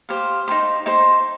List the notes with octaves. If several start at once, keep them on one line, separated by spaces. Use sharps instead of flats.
G4 C5 F5
D#4 C5 G5 C6
D#4 C5 G5 C6